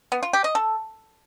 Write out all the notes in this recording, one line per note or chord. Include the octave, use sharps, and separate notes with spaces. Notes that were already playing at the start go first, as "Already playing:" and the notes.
B3
F4
G4
D#5
A4